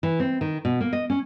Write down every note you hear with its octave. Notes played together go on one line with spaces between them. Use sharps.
E3
C4
D#3
B2
A#3
D#5
C#4